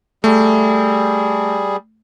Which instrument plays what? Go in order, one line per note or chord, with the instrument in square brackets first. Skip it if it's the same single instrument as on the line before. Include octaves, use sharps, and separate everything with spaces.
[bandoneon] G3 G#4 [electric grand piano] A3